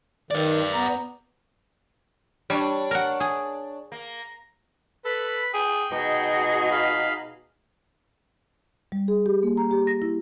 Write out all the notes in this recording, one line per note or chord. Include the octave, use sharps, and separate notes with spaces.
D#3 B4 D5
B3 A#5
G3 D4 C#5
A#4 F#5
G#4
A#3
A4 B4 B5
G#4 G5
B2 D#4 F#4 G#4
F5 B5
G3
G#4
G4
A#3
A#5
G4
A#6
E4